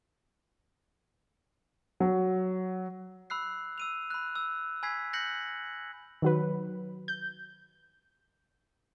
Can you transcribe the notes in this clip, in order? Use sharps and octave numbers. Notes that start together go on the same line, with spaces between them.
F#3
B5 E6 F#6 C7
E6 D#7 F7
B5 F#6
E6
G#5 B5 E6 G#6 B6 C7
F#6 G6 A#6 C7 C#7 F#7
D#3 F#3 B4
G6